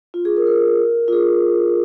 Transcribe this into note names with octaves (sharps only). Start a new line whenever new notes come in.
F4
G#4
A#4
A#4
F4
G#4